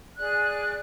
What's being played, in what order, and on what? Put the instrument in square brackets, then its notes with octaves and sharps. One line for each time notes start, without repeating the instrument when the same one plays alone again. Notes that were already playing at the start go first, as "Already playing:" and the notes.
[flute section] G#4 D5 F#6